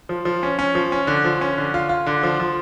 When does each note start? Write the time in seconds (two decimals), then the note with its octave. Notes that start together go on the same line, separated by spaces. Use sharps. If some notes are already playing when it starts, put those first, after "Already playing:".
0.09 F3
0.25 F3
0.43 C#4
0.59 C#4
0.75 F3
0.92 C#4
1.07 D3
1.25 F3
1.41 C#4
1.58 D3
1.74 F4
1.89 F4
2.06 D3
2.23 F3
2.40 F3